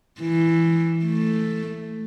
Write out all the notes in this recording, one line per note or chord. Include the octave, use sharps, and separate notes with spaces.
E3
A3